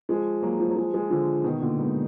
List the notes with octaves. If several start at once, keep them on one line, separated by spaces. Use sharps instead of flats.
F3 G#3
F#3 A#3
F3
F#3
F3 G#3
F3 G#3
D3 F3
B2 D#3
A#2 D3
G#2 B2